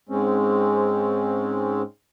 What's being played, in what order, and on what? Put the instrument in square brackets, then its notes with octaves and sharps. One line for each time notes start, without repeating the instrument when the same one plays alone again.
[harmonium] G#2 G#3 C4 C#4